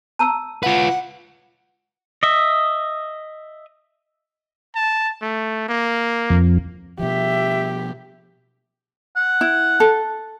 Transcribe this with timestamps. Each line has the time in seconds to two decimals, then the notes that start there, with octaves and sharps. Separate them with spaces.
0.19 A5 A#5 E6
0.63 F4 B4 F5 F#5
2.23 D#5 E5
4.75 A5
5.22 A3
5.69 A#3
6.30 F2
6.99 B2 F3 G4 E5
9.16 F#5
9.41 E4
9.80 A4